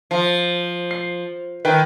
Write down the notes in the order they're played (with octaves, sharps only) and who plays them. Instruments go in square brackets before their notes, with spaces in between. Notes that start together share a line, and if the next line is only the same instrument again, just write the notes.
[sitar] F3
[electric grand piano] C7
[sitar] D#3 [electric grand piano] B4 G5